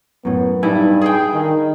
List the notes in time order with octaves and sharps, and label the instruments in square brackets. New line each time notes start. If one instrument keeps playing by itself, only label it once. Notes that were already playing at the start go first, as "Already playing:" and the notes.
[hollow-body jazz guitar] F#2 A2 [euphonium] B3
[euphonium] G2 [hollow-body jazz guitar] D#4 D5 G#5 [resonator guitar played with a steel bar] E4
[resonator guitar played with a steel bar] G#4 G5
[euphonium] D#3